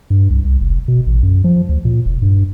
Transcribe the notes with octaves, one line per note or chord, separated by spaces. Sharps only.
G2
C2
C2
F1
B2
A1
F#2
F3
D2
A#2
E1
G2